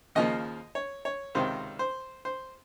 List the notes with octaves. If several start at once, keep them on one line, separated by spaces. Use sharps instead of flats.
D#2 C#3 F3 A#3 D#5
C#5
C#5
C#2 C3 D#3 C5
C5
C5